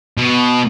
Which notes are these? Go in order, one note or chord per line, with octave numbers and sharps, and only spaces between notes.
B2